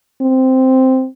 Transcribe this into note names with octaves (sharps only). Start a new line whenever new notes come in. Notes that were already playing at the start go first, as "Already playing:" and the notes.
C4